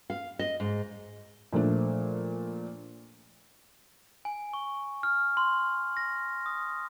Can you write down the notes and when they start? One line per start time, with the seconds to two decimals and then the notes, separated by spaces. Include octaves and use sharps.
0.10 F5
0.39 D#5
0.60 G#2
1.52 A#2 F3 A3 D4
4.25 G#5
4.53 C#6
5.03 F6
5.37 C6
5.97 A#6
6.46 D#6